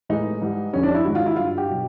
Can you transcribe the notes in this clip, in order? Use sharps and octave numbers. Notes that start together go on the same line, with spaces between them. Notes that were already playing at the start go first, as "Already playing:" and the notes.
A2 E3 G#3 D#4
G#2 E3 G3
F2 D3 G3 C#4
D4
E4
G#2 D#3 G#3 F#4
F4
E4
G2 D3 F#3 F4
G4
B2 F#3